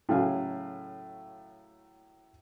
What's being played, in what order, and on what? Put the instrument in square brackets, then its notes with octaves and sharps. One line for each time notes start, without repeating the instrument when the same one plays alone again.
[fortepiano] A2 C#3 F#3 F5 G#5